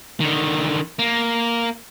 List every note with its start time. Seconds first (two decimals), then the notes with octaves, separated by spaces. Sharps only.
0.20 D3 D#3
0.99 A#3